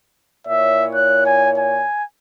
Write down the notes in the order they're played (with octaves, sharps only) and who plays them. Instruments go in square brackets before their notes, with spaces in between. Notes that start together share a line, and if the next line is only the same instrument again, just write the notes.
[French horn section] A#2 E4 C#5 [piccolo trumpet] E5
[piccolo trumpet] F#6
G#5
G#5